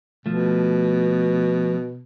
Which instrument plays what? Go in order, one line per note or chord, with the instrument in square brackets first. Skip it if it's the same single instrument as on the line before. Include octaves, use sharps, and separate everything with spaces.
[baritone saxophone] B2 [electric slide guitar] F3 A3